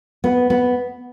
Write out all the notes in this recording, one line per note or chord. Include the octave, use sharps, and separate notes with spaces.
B3
B3